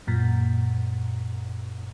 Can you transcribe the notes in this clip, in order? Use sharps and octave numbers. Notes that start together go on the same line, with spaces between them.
F#2 A#2